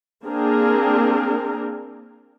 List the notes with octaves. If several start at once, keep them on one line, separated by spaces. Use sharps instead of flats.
A#3 C4 D4 G#4 A#4